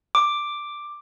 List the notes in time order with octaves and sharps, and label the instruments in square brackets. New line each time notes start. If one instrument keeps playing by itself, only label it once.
[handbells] D6